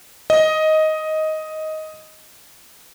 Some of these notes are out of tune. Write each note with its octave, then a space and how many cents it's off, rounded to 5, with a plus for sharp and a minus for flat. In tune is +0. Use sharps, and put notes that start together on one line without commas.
D#5 +10